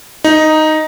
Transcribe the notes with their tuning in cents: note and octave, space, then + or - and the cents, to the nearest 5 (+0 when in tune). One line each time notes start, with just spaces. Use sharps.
D#4 +0